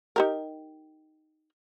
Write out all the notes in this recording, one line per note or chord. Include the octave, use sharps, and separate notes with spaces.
D#4 G4 A#4